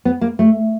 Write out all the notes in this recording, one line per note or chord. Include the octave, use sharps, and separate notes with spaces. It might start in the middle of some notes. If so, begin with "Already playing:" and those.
B3
A#3
A3